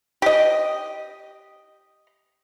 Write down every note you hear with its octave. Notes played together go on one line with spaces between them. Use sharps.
G4 D#5